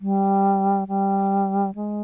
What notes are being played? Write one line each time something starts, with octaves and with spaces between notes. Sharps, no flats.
G3
G3
G#3